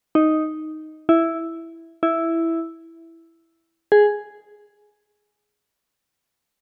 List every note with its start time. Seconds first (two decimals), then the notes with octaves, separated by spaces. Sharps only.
0.15 D#4
1.09 E4
2.03 E4
3.92 G#4